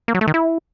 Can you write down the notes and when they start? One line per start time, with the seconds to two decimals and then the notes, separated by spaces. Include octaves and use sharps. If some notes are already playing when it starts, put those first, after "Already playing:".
0.08 A#3
0.15 F#3
0.21 A3
0.28 D#3
0.34 E4